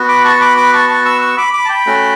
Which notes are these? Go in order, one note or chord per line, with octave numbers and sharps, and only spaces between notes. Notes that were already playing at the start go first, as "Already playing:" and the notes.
Already playing: B3 F#4
B5 D6
A5 C#6
C#6
B5 D6
B5 D6
A5 C#6
A5 C#6
C#6 E6
C#6 E6
B5 D6
B5 D6
A5
G5 B5
A3 C#4 F#4